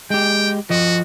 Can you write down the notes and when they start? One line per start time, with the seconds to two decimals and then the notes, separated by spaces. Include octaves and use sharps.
0.10 G#3 G4 G5
0.70 F3 F#4 D#5